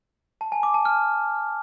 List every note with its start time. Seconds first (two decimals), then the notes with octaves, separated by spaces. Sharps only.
0.41 A5
0.52 G#5
0.63 D6
0.74 A5
0.85 F6